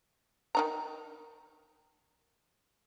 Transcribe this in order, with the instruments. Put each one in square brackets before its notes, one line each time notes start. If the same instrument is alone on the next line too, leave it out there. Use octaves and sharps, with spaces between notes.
[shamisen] D#3 D#4 A#5